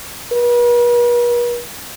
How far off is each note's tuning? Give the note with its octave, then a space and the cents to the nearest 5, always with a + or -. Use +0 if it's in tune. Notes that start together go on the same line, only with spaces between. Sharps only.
B4 -45